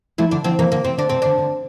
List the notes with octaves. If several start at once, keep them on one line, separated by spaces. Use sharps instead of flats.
F3 A3 E4
D3 D4
D3 F3 C4
C3 E3 A#3
D3 A#3
C3 C4
D3 D4
C3 C4
D3 D4
D3